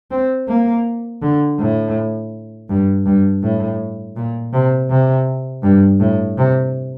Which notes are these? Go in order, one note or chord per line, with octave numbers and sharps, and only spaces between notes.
C4
A#3
D3
A2
G2
G2
A2
A#2
C3
C3
G2
A2
C3